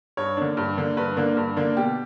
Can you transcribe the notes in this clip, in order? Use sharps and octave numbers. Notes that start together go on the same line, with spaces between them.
G2 C#5
D3 A#3 D4
G2
D3 A#3 D4
G2 B4
D3 A#3 D4
G2
D3 A#3 D4
B2 G4